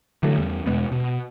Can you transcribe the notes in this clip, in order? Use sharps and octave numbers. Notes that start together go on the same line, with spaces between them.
D3 E3 F#3 A3
E2 G3
E2 B2 G#3 B3
B2